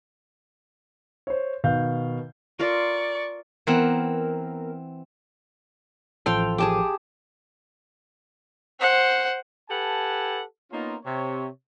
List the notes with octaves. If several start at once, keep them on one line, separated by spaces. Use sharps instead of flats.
C5 C#5
B2 D#3 F5 G6
F4 A4 A#4 D5 C#6
E3 B3 C4 A#4 F#5
A1 F3 A4 F5 G5 C6
G4 G#4 A5 D6
C5 F#5
G4 A4 B4 F#5 G#5 A5
A#3 B3 C#4 D#4 F4
C3 C#5